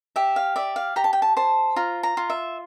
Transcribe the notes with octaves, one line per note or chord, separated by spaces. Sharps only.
G4 E5
F5
D5 E5
F5
G4 A#5
A5
G5
A5
C5 A5
F4 A#5
A#5
F4
E5